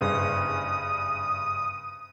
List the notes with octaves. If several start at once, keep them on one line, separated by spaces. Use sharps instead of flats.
F#1 G2 G#4 D#6